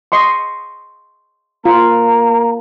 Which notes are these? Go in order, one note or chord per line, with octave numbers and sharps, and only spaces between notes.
D#5 C6 C#6
A#3 F4 A#5